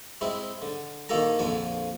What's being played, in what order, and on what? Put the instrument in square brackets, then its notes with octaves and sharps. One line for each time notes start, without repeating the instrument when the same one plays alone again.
[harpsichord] G#3 C4 E4
D3
A#1 D#3 A#3 A4 G#5 A#5
A#1 F2 D3 F3 G#5